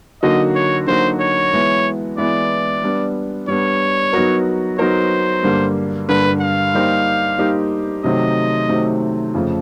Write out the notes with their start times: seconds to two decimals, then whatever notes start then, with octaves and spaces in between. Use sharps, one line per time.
0.22 D3 F#3 A#3 D#4 F#4 D#5
0.55 C#5
0.87 D3 F#3 A#3 D#4 F#4 C5
1.20 C#5
1.53 E3 G#3 B3 E4
2.18 E3 G#3 B3 E4 D5
2.83 G3 B3 D4
3.48 G3 B3 D4 C#5
4.13 F#3 B3 D#4 F#4 A#4
4.78 F#3 B3 D#4 F#4 A#4 C5
5.43 G2 D3 G3 A#3
6.09 G2 D3 G3 A#3 B4
6.41 F5
6.74 G3 A#3 D#4 G4 C5
7.38 G3 A#3 D#4 G4 C5
8.04 C3 D#3 F#3 A3 C4 D#5
8.69 C3 D#3 F#3 A3 C4
9.34 F2 C#3 F3 A3